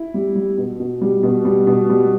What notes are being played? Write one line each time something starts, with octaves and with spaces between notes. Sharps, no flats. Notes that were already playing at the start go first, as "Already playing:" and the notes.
Already playing: E4
G3
G3
B2
B2
G3
B2
G3
B2
G3